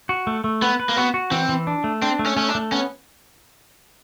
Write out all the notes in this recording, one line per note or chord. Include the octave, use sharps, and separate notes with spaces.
F#4
A3
A3
B3 B4
B4
A#3
B3 F#4
F#4
E3 C4
E3
D4
A3
C4 D4
A3
C#4
A3 C#4
D4
A3
B3 C#4